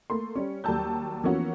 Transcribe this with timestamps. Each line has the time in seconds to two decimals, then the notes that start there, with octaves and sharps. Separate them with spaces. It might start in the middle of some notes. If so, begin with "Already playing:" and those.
0.10 A3 A#3 C6
0.35 G3 C#4
0.64 D#2 F#3 G3 A5 E6 G6
1.24 E3 F3 A#3 B3 C#4 F#4